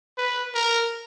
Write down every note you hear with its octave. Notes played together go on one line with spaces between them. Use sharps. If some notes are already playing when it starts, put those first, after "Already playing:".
B4
A#4